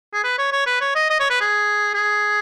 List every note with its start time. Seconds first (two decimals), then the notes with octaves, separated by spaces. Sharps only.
0.14 G#4
0.24 B4
0.38 C#5
0.52 C#5
0.67 B4
0.81 C#5
0.96 D#5
1.10 D#5
1.20 C#5
1.30 B4
1.41 G#4
1.95 G#4